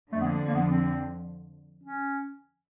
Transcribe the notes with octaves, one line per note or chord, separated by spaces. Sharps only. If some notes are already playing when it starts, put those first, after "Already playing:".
F2 D3 F3 A3
B3
A#3
A#3
B3
C4
C#4